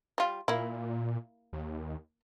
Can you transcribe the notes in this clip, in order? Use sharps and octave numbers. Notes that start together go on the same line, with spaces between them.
G3 F4
A#2 A#3 E4
D#2